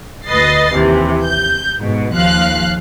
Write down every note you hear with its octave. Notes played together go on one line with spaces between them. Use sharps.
D2 B4 D#5 A6 C7
D#2 C3 E3
G6
G#2 B2
D#2 F3 F5 F#6